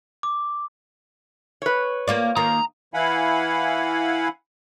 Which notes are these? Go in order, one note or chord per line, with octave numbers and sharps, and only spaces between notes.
D6
B4 C#5
A#3 F4 D5
D#3 A#3 F4 A#5
E3 E4 F5 F#5 G#5 B5